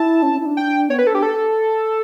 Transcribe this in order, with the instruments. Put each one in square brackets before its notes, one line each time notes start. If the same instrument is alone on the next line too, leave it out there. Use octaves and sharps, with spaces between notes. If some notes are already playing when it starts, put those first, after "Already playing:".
Already playing: [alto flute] E4 [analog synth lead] A5
[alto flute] C#4
C#4
E4
D4
[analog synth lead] G5
[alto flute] B3 [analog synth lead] C#5
[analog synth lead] B4
A4
[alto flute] D4 [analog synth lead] G4
[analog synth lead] A4